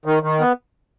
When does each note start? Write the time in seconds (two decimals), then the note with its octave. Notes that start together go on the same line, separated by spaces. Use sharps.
0.05 D#3
0.23 D#3
0.40 B3